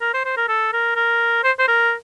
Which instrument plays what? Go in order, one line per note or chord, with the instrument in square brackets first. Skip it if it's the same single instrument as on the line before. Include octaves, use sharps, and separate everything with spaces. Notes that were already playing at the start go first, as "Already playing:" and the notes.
[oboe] A#4
C5
C5
A#4
A4
A#4
A#4
C5
C5
A#4